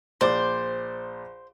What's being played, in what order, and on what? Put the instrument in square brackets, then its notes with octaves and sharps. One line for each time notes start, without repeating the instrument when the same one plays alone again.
[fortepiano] A#1 D5 D6 [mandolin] C5